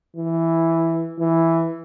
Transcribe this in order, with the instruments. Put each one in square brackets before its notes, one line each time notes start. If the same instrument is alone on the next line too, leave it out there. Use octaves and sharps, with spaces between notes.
[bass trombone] E3
E3